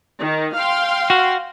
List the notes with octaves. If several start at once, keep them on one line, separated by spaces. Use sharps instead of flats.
D#3
F5 G5 C6
F#4